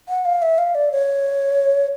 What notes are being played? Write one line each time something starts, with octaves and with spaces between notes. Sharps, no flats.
F#5
F5
E5
F5
D5
C#5